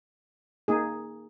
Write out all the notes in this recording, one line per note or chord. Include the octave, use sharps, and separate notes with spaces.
A#3 D#4 G#4